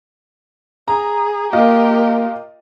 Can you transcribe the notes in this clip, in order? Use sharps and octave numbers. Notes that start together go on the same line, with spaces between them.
G#4 A#5
A#3 F4 G4 A#4 D#5